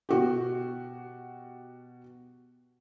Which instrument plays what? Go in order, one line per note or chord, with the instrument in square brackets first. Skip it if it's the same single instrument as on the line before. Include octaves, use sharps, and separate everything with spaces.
[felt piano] B2 F#4 G4